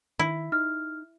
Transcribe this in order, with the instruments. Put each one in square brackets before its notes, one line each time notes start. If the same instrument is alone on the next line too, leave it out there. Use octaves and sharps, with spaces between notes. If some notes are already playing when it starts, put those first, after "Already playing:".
[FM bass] D#3 [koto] E4
[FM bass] D#4 [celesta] F6